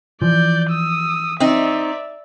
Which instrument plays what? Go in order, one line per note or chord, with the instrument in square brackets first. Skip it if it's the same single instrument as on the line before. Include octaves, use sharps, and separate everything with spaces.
[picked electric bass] E3 F3 [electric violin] D5 G6
[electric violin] D#6 E6
[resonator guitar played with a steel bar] C4 D#4 [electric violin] D5 E5